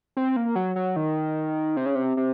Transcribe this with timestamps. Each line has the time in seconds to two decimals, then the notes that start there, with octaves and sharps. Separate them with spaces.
0.17 C4
0.36 A#3
0.56 F#3
0.76 F#3
0.96 D#3
1.77 C3
1.86 C#3
1.95 C3
2.17 C3